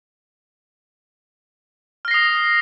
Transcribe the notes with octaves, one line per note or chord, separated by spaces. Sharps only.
D#6 F6 A#6 C7